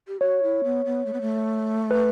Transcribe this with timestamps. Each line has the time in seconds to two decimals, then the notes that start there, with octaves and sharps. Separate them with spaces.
0.08 G4
0.21 F#4 C#5
0.43 E4
0.64 B3
0.85 B3
1.06 A3
1.13 B3
1.21 A3
1.91 B4